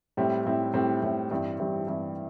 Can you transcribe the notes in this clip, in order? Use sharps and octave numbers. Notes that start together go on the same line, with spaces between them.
A2 G3 C4 E4
A2 G3 C4 E4
A2 G3 C4 E4
A2 G3 C4 E4
G2 E3 G3 C4 E4
G2 E3 G3 C4 E4
G2 E3 G3 C4 E4